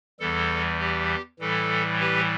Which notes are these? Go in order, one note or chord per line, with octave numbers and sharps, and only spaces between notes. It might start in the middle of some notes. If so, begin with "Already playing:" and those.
E2 E3 G3 A4
G4
A2 E3 G3 A4
G4 B4